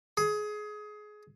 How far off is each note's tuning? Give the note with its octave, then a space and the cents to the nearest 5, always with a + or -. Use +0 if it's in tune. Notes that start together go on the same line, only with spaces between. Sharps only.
G#4 +20